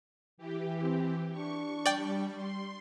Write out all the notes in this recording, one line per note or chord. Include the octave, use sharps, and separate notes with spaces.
E3 G4
C4
D4 C#6
G3 D5 G5
C6